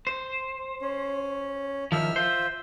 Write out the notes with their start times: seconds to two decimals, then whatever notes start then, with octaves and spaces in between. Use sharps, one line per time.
0.07 C5
0.81 C#4
1.92 D#3 F3 E5 F6
2.16 F4 C5 E5